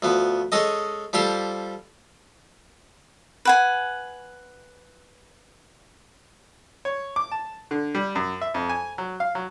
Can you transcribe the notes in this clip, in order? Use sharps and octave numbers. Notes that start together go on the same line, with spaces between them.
D2 F3 B3
G#3 C#4 A4 D#5
F3 G3 G4 A4 C5
B4 F#5 G#5
C#5
D6
A5
D3
G3
F#2
E5
F2
G#5
F#3
F5
F#3